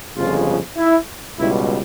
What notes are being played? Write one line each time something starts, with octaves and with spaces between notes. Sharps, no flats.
G1 F2 C#3 F3 G#3 F4
E4
C#2 B2 G3 E4